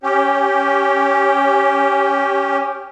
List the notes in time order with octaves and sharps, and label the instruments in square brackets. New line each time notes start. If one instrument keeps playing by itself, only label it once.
[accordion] C#4 G4